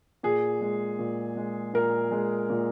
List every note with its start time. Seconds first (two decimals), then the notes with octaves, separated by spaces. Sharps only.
0.23 A#2 G#4
0.61 G#3
0.99 A#2
1.36 G#3
1.74 A#2 A#4
2.11 G#3
2.50 A#2